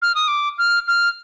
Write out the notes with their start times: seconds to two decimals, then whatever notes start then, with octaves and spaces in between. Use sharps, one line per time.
0.02 F6
0.15 D#6
0.28 D6
0.58 F6
0.88 F6